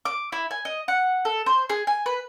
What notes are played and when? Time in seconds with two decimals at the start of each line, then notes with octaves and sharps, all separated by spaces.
0.05 D6
0.32 E4
0.51 G#5
0.65 D#5
0.88 F#5
1.25 A4
1.46 C5
1.70 G#4
1.87 G#5
2.06 B4